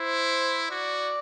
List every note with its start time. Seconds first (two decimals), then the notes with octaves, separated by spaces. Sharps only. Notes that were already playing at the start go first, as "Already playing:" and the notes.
Already playing: E4 C5
0.70 F#4 D5